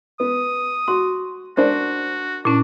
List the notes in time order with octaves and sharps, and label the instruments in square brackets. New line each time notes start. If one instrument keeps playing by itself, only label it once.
[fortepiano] B3 [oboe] D#6
[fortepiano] F#4 [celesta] C6
[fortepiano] D4 C5 D5 [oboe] F#4 [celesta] A#4
[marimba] A#2 C#4 [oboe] D4 [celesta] E4